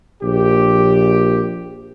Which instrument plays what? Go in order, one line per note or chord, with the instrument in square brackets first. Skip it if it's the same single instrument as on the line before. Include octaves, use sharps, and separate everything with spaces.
[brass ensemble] A#1 G4